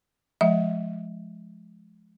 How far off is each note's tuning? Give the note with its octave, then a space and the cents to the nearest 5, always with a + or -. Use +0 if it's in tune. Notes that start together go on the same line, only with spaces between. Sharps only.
F3 +0 G#3 +30 E5 -5